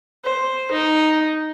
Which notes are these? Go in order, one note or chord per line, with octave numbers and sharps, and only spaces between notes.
C5
D#4